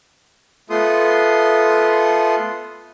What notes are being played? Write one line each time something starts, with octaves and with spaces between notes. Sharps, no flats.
A3 B3 F4 A4 C6 D#6